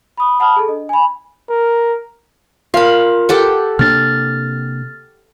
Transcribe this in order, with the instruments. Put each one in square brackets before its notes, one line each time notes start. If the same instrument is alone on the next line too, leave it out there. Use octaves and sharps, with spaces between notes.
[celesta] B5 D#6
F#5 A5 B5 D#6 F6
G#4 A4
D4 D#5
G#5 B5
[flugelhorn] A#4
[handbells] F4 A#4 [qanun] F5 B5
[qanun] G4 A4 F#5
[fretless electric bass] C3 A#3 D4 [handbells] F6 A6